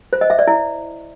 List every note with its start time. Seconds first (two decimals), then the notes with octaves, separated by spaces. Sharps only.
0.13 C5
0.21 D#5
0.30 E5
0.39 D5
0.47 E4